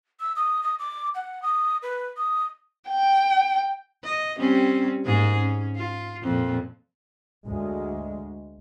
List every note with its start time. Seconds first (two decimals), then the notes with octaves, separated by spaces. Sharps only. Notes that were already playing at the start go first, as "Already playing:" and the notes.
0.20 E6
0.36 D#6
0.63 D#6
0.79 D6
1.15 F#5
1.42 D#6
1.82 B4
2.17 D#6
2.89 G5
4.04 D#5
4.39 G3 C4 C#4
5.06 G#2 A#3 G#4
5.39 C#4
5.76 F4
6.23 F2 A#2
7.46 D2 G#3